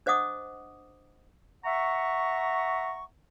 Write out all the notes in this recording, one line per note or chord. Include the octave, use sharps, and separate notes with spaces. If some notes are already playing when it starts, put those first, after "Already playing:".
D4 C5 D#5 F#5 D6 D#6
E5 F#5 A#5 C#6